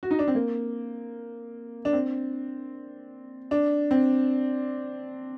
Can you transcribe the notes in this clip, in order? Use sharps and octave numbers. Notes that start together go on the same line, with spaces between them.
F#4
D#4
D4
C4
A#3
D4
C4
D4
C4